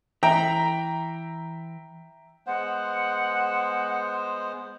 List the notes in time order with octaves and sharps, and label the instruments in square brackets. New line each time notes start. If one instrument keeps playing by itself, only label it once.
[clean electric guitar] E3 [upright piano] E5 G5 A#5
[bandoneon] G#3 B3 C5 [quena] F#5